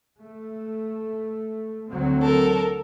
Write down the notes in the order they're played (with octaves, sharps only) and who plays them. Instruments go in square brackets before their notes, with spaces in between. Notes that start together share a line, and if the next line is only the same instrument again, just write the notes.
[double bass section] A3
D2 F#3 C4
[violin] A4 A#4